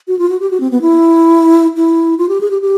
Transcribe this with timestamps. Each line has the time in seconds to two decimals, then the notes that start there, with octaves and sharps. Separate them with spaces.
0.08 F#4
0.19 F4
0.30 F#4
0.40 G4
0.51 F#4
0.60 C4
0.71 B3
0.82 E4
1.77 E4
2.18 F4
2.29 G4
2.41 G#4
2.51 G4
2.62 G4